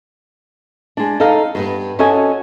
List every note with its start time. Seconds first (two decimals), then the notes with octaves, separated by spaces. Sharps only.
0.97 G#3 D4
1.20 D#4 A4 D#5 F5
1.55 G2 B3
1.99 C#4 F#4 A4 D#5 G#5